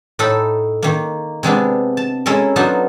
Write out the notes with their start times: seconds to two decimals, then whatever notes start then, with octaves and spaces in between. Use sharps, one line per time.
0.19 A2 D#4 A4 A5 B5
0.83 D#3 A#3
1.43 C3 G#3 B3 D4
1.97 A5
2.26 G#3 C#4 E4 A4 A#4
2.56 F#3 B3 D4 D#4 F4 F#4